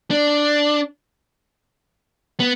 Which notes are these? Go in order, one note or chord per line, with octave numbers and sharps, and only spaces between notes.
D4
B3